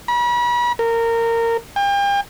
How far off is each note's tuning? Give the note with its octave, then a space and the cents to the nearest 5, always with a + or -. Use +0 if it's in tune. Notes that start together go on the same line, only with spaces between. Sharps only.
B5 -40
A#4 -20
G5 +40